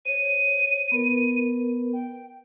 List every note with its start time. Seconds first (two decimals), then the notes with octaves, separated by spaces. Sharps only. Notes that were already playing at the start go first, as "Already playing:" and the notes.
0.05 C5 C#5 D#7
0.92 B3 A#4 B4
1.93 G5